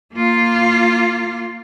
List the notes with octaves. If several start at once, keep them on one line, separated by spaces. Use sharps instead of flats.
A#3 F4